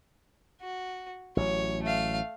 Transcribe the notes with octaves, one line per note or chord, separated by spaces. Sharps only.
F#4
A1 F#3 C#5
A3 F5